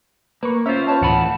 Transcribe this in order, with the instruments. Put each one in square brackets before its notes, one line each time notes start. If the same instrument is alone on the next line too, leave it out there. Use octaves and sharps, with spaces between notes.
[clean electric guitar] A#3 [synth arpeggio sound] B4 C#6
[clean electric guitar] C#4 F4 [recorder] C5 [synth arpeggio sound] E5
[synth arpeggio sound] B4 C#5 D#5 [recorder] A5
[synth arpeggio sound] D2 A2 [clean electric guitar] E3 F#5 B5